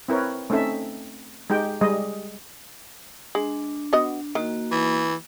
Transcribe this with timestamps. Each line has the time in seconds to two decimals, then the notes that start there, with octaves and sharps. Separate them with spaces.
0.08 C4 E4 A#4 B4 C#5
0.50 A3 C4 C#4 D#4 A4 E5
1.50 G#3 D#4 G4 G5
1.81 G3 G#3 D#5
3.35 G#3 D4
3.93 B3 F#4 D#5
4.35 D#3 A#3 F#4
4.72 E3